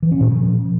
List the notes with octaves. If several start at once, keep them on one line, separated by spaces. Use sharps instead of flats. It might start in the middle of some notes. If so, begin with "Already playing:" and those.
E3
C#4
A#2
F3